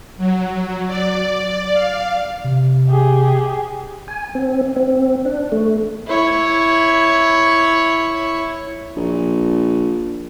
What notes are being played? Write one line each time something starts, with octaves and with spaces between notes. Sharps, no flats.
F#3
D5
F5
C3
G4 G#4
G#5
C4
C4
D4
A3
E4 C#5
A#1